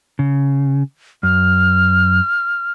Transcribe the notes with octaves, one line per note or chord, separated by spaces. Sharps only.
C#3
F#2 F6